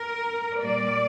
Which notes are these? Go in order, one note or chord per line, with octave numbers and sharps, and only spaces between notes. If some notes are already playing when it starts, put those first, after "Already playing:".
Already playing: A#4
A#2 G3 A#3 D5